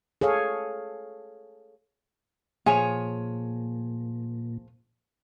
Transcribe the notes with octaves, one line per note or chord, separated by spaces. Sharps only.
G#4 A4 C#5 F5
A#2 F3 G#4 C#5 G#5